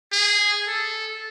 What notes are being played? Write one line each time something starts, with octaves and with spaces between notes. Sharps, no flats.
G#4
A4